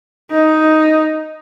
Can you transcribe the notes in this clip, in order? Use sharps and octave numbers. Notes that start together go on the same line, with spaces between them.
D#4